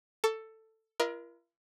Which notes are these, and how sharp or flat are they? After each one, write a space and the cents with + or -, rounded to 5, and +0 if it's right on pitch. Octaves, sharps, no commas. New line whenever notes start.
A4 +10 C#6 +35
F4 -45 A#4 +30 D#5 +0